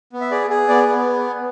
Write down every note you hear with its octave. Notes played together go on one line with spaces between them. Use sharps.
B3
E5
G#4 D5
G#4
B3 D5
B3